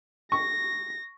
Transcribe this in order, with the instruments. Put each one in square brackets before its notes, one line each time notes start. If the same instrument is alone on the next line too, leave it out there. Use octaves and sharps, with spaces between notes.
[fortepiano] C#6 [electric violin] A#6